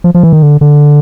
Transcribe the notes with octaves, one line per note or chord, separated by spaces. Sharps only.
F3
F3
E3
D#3
D3
D3